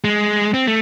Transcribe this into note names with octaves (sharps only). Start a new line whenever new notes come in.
G#3
C4
A3